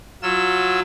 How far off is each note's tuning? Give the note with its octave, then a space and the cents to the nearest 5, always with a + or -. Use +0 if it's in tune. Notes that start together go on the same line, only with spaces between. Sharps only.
F#3 -10 F4 +0 E6 +0